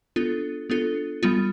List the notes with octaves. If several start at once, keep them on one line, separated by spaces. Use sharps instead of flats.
B3 D4 F4 A4
B3 D4 F4 A4
G3 B3 F4